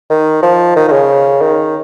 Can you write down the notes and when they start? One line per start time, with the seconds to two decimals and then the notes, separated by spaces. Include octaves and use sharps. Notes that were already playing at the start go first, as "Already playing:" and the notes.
0.10 D#3
0.43 F3
0.76 D#3
0.88 D#3
0.92 C#3
1.42 D#3